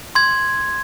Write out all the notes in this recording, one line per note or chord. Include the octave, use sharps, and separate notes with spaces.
C6 G#6